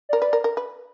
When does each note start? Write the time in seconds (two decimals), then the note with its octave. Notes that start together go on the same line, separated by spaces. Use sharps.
0.09 A#4 D5
0.22 B4
0.33 A#4
0.44 A#4
0.57 B4